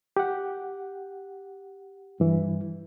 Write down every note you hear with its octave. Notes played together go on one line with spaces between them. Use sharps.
G4 F#5
G2 E3